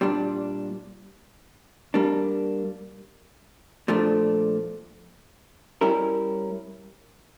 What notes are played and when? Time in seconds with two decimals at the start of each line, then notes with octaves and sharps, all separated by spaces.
0.01 A#2 G3 D4
1.94 G3 A#3 D4
3.88 A#2 F3 A3 D4
5.81 G3 C#4 E4 A#4